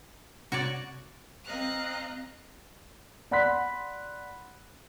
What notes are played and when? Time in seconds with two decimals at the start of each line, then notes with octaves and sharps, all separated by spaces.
0.52 C3 F#4 C#5 D5
1.45 C4 D#5 F5 A#5 F#6
3.31 D5 F#5 B5 C6 F#6 B6